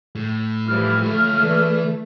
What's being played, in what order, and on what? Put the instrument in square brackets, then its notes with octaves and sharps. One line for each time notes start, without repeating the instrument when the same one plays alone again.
[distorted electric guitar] A2
[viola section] E3 F3 G3 [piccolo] F6
[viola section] A3 [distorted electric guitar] F4 C#5
[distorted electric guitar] E3 [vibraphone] B4 D5